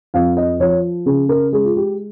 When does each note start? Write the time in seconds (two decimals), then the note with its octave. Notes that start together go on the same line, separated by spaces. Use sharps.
0.14 F2 F5
0.37 D#5
0.60 F3 C#5
1.06 C#3 G#4
1.29 A#4
1.52 G#3 G#4
1.65 F4
1.76 G4